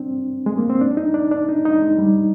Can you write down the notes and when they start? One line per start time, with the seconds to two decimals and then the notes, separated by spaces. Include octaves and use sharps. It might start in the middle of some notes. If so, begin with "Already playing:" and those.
Already playing: C4 D4
0.46 G#3
0.58 A#3
0.70 C4
0.81 D4
0.97 D#4
1.14 D4
1.31 D4
1.49 D#4
1.65 D#4
1.82 G#3
1.98 G3